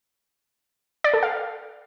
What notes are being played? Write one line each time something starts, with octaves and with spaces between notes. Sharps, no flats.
D5
A4
F5